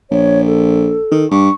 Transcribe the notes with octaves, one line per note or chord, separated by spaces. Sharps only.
A#1 C#5
A4
D#3
G2 C#6